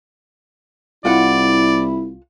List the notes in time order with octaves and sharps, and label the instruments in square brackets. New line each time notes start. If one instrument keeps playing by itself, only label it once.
[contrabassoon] C2 [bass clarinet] E4 [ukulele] F4 F#5 [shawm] D5